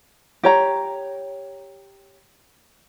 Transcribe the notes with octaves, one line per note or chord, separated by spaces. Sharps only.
G4 C#5 A#5